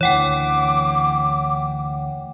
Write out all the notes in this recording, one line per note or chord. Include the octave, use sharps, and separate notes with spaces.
D2 E3 C#5 F#5 G5 D6